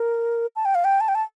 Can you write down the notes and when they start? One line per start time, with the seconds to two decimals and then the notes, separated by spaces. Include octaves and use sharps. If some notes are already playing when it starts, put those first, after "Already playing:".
Already playing: A#4
0.56 A5
0.65 G5
0.75 F5
0.84 G5
1.01 A5
1.08 G5
1.15 A5